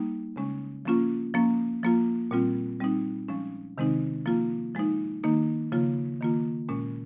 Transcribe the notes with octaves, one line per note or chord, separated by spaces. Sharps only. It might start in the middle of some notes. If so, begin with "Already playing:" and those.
Already playing: G3 A#3 D#4
C#3 G#3 C#4
F3 A#3 C#4 F4
F3 A#3 C#4
F3 A#3 F4
A#2 G3 C4 F4
G3 C4 D#4
F3 G#3 C#4
C3 D#3 G#3 C4 D#4
F3 A#3 F4
F3 G#3 D#4
D#3 A#3 D#4
C#3 F3 A#3 F4
D#3 A#3 F4
A#2 G#3 C#4